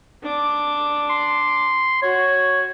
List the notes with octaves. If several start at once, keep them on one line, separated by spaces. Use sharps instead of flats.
D4 D6
C6
F#4 C#5